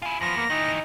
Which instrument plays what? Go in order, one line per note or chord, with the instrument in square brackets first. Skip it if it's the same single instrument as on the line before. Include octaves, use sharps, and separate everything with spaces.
[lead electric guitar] E4 F4 [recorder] G#5
[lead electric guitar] E2 B3 [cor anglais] F3 [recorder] A#6
[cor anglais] A#3
[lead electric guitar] D#3 E3 [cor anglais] D#4